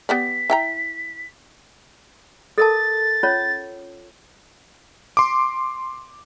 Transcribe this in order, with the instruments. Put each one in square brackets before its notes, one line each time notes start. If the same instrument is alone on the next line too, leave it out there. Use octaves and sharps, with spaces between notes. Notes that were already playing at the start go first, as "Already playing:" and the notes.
[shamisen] B3 G4 D5 [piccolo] B6
[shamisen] E4 G5 A#5
[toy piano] A4 A#4 A5 [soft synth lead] A6
[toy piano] C#4 F4 C#5
[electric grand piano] C6 D6